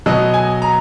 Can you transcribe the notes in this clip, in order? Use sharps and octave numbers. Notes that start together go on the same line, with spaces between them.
B2 F#3 D#5
G#5
A#5